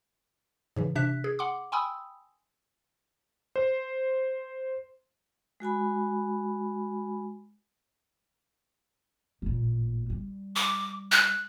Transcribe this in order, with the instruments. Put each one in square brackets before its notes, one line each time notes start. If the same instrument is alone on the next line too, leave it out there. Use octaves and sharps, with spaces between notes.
[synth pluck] G#2 C#3 E3
C3 D4 E5 F#6 B6
G#4
F#5 C6 D6
G5 G#5 B5 C6 D#6 E6
[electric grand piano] C5
[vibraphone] G#3 F#4 G#5 B5
[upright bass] A1 A#2
G3
[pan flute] D6
F#6